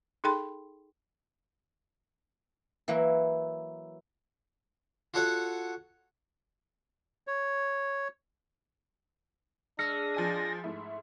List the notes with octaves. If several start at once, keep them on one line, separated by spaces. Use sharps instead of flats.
D#4 G#4 A4 G5 B5 C6
E3 F#3 A#3 E4 B4
F4 F#4 A4 C#5 F#5
C#5
G#3 D4 E6 F6 A#6 C#7
F3 G#5 D#7
G#2 A3 E4